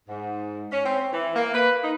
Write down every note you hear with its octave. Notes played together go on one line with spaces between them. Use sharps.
G#2
C#4
C4
E3
A#3
B4
D#4